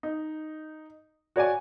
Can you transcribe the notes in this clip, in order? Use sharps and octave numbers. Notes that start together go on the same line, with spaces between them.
D#4
F#4 C#5 D5 G#5